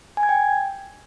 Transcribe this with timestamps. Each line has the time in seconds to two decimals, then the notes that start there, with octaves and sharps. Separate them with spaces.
0.17 G#5
0.23 G#6
0.29 G5